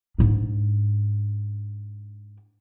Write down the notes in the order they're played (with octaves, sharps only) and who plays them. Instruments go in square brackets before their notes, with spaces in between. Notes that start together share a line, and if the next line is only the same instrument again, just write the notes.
[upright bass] G#2 D4